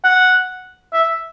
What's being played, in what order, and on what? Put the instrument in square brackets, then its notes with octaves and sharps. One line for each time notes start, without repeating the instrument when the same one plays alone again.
[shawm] F#5
E5